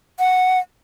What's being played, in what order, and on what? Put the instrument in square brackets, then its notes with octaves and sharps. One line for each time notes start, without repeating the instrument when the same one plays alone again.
[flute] F#5